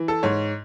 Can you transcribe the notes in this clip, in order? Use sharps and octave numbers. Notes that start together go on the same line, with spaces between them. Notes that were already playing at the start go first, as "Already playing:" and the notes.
Already playing: E3
A4
G#2 C#5